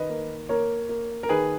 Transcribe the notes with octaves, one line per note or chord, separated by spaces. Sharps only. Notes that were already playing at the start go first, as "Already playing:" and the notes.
Already playing: D#3 B4 D#5
A#3
A#3 A#4 C#5
A#3
A#4
D#3 G#4 B4